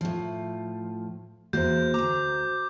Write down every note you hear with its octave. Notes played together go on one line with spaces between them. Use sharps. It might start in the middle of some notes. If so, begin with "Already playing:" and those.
A2 F3
E2 A#3 F#4 C5 G6
D2 A#5 D6